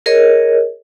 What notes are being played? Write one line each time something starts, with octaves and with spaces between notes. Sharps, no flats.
G#4 A#4 C#5 D#5